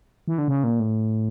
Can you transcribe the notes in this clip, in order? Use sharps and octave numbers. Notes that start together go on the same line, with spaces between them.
E3
D3
C#3
A#2
A2